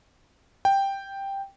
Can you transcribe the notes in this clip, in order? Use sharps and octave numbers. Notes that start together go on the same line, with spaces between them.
G5